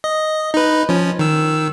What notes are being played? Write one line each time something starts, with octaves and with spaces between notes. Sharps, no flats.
D#5
D#4 B4
F3 C#4
D#3 E6